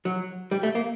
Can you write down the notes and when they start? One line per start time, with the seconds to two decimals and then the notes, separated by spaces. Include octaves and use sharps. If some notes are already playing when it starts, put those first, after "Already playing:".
0.05 F#3
0.51 G3
0.63 A3
0.75 A#3